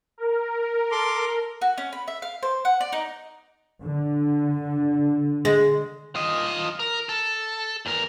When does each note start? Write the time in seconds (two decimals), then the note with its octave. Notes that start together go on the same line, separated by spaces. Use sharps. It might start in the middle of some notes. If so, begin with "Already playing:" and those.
0.18 A#4
0.91 A4 C6 D6
1.62 F#4
1.78 C#4
1.93 B5
2.08 E5
2.22 F5
2.43 C5
2.65 F#5
2.81 D5
2.93 D#4
3.82 D3
5.45 G#3
6.15 F4 D#5
6.79 A#4
7.09 A4
7.86 E2 A#4